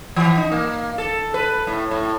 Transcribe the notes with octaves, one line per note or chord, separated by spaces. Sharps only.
E3
D#4
A#3
A4
B4
A2
A2